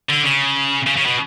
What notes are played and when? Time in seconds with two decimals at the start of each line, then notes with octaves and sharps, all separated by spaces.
0.10 D3
0.24 C#3
0.87 C#3
0.97 C#3
1.06 B2